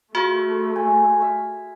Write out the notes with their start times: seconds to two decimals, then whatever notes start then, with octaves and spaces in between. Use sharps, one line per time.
0.15 A3 F4 F#4 G#4
0.76 G#5
1.22 E5